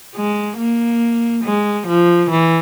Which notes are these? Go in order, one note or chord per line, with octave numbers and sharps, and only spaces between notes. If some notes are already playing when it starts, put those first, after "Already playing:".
G#3
A#3
G#3
F3
E3